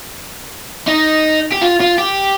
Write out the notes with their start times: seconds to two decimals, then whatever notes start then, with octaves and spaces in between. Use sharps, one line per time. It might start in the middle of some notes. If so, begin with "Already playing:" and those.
0.88 D#4
1.52 G4
1.62 F4
1.80 F4
1.98 G4